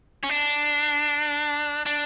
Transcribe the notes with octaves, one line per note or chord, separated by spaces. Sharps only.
C#4
D4
D4